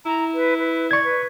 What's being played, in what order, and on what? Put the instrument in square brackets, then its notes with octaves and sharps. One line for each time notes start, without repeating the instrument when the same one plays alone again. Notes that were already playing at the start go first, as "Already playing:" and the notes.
[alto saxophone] E4 [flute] A#5
[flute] B4
B4
[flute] D5 [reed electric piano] C#6 G#6
[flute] B4